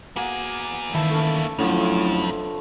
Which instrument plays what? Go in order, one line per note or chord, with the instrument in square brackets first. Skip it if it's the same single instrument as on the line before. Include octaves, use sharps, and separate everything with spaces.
[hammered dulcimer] A#3 [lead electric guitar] B3 G#4 [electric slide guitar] F#4
[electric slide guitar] D#3 E3 [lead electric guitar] A#3 E4 [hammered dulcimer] A4 B4 A5
[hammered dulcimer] A3 C#4
[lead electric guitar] F2 [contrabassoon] A2 [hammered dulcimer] D3 F3 [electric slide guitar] F#3 C#4